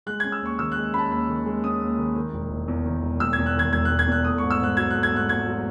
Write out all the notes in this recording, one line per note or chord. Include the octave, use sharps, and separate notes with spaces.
G#3 F#6
G#6
C#4
E6
D#2 C#6
D#3 E6
F#6
G#3
C#4 A5 B5
D#2 B5
D#3
G#3
C#4 D#6
D#2
D#3
D#3
E1
E1
E2
D#3
E1
E1 E6
G#6
E2
F#6
D#3 G#6
E1 G#6
F#6
E1
G#6
E2 F#6
A3 D#6
C#6
G#2
E6
G#2 F#6
F#3 G#6
F#6
A3
G#6
G#2 F#6
G#2 G#6
F#3